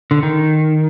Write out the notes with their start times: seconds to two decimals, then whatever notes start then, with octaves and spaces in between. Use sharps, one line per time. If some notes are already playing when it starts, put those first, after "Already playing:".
0.11 D3
0.23 D#3